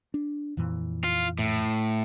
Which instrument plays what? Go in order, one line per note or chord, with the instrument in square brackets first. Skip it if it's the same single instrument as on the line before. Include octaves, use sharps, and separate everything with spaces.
[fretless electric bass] D4
F2 A#2 E3
[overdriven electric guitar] F4
A2